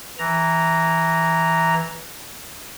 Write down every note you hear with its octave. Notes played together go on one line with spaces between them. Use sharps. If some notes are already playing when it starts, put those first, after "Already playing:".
E3 A#5